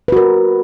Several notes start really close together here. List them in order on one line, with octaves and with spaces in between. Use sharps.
B4 F#4 A#4